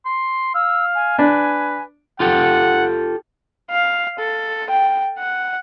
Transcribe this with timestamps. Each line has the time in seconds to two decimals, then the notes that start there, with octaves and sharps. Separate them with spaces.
0.05 C6
0.54 F5 E6
0.95 G#5
1.18 D4 B4
2.20 F4 G4 A4 F#5
3.71 F5
4.19 A4
4.70 G5
5.19 F#5